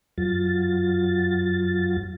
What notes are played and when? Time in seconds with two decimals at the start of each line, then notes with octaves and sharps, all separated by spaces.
0.18 F#2 F#3 F4 A6